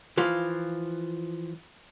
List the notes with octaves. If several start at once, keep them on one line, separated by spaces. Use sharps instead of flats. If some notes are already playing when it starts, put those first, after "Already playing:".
E3 F3 F4